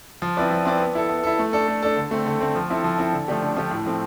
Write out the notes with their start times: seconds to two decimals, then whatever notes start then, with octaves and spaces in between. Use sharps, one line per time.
0.22 F3
0.37 C4 E4 B4 D5
0.51 F3
0.65 C4 E4 B4 D5
0.80 B3
0.95 E4 A4
1.09 B3
1.23 E4 A4
1.39 A3
1.53 D4 A4
1.68 A3
1.82 D4 A4
1.96 D3
2.11 A3 C4
2.26 D3
2.40 A3 C4
2.55 F3
2.70 C4 E4 A4
2.84 F3
2.98 C4 E4 A4
3.13 D3
3.28 F3 A3 D4 G4
3.42 D3
3.56 F3 A3 D4 G4
3.71 A2
3.86 F3 A3 C4